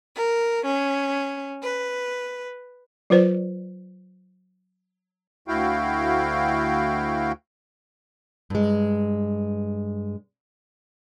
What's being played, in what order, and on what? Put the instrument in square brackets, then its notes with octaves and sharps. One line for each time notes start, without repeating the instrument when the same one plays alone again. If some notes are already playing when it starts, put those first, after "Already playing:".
[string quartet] A#4
C#4
B4
[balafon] F#3 F4 B4 C5 D5
[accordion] D2 E4 F#4 F5 G5
[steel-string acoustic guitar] G2 G#3